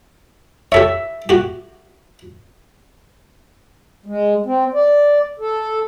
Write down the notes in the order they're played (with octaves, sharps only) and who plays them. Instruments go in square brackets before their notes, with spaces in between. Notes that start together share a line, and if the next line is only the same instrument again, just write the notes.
[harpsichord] G4 A4 C#5 [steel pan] E5
[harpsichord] F#4 G4
[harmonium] G#3
C4
D5
A4